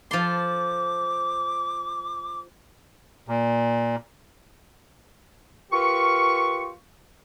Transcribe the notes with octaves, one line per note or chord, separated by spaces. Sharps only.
F3 A4 C6 D6
A#2
F4 G4 A#4 B4 C#6